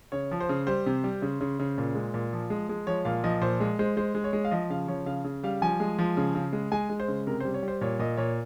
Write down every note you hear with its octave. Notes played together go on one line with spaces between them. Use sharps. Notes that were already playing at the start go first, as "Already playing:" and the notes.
C#3 C#5
F3
C5
C#3
G3 C5
C3
G3
C#3
C#3
C#3
A#2
G#3
A#2
F3
G#3
G#3
F3 C#5
A#2 F5
F3 D#5
A#2 C5
G#3
G#3 C5
G#3 C5
G#3
C#5
G#3
F5
F3 D#5
C#3 F5
F3 C#5
C#3 F5
C#3
G3 F5
F3 G#5
G#3
F3
C#3
C#3
G#3
G#3 G#5
G#3
C5
C#3
C3 A#4
G3 C5
C#5
G3
C5
A#2 C#5
A#2 D#5
A#2 C#5